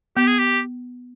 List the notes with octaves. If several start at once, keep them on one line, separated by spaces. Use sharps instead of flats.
B3 G4
G#4
G4